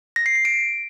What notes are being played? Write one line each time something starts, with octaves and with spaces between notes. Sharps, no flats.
A#6
C7
A#6
D7